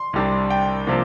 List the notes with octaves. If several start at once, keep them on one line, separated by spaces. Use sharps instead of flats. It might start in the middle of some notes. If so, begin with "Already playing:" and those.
Already playing: C6
C2 C3 G3 D4
G5
C3 F3 A#3 D4